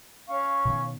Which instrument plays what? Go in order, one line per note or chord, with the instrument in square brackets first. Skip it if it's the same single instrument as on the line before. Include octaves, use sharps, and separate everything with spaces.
[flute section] C#4 F5 C#6
[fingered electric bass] B2 D#3